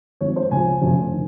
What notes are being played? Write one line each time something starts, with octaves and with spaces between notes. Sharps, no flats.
G#1 G#2 F3 C#5
C5
C#2 C#3 F3 G#5
F1 F2 C#3 F3
D#3